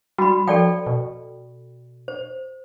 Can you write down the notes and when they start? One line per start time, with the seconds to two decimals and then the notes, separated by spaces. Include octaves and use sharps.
0.18 G3 F#4 B5
0.48 F3 A4 D5 G5
0.87 B2
2.08 C5